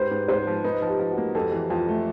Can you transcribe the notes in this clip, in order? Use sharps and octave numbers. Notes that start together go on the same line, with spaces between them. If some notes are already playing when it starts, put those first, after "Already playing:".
Already playing: G#2 G4 B4 C5
G#2
G#2 C5
F3
D#4 B4
F3
G4
F3
F#4
A#3
F2 A4
E3
F2 F4
A3